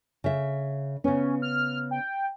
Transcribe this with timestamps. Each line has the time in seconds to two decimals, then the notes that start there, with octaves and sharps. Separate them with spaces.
0.24 C#3 E5
1.04 C#3 B3 C#4
1.42 F6
1.91 G5